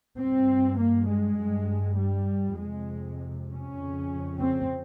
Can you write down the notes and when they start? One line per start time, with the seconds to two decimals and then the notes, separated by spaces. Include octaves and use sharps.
0.19 G2 C4
0.79 A#3
1.09 G#3
1.39 G2
1.99 G3
2.58 F2 C3 G#3
3.50 C#4
3.78 F2
3.84 C#3
4.39 C4